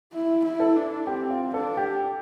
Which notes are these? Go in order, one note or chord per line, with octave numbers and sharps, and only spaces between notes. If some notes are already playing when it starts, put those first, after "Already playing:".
E4
E4
A4
D4
C4 G4
F4
D4 A4
G4